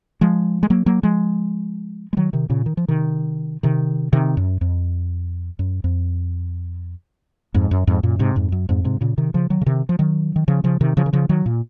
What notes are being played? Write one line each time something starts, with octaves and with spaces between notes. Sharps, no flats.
F3 G#3
G#3
F#3 A#3
F#3 A#3
F3 G#3
G#3
D#3 F#3
C3 D#3
A#2 C#3
D#3
F3
C3 D#3
C3 D#3
C3 D#3
F#2
F2
F#2
F2
F2 G#2
F#2
F2 G#2
F#2 A#2
G#2 C3
F2 G#2
F#2
F2 G#2
G#2 C3
A#2 C#3
C3 D#3
C#3 F3
D#3 F#3
C#3
C3 D#3
F3
D#3 F#3
D#3
C#3 F3
C#3 F3
C3 D#3
C#3 F3
D#3
C#3 F3
D#3 F#3
A#2